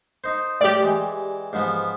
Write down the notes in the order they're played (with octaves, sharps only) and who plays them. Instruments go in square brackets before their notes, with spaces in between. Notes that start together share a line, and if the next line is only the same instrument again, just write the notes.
[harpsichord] D#4 C5
[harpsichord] A2 G3 [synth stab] G4 D5
[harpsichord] E3 G#3
G#2 F3 B3